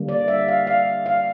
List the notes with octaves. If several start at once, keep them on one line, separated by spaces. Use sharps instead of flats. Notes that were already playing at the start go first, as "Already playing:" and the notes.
Already playing: D3 G3 A#3
D5
E5
F5
F5
F5